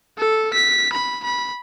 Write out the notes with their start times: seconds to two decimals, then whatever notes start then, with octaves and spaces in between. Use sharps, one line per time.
0.18 A4
0.53 B6
0.93 B5
1.24 B5